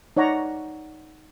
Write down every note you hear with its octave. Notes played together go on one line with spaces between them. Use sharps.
D#4 C#5 D5 F#5 A#5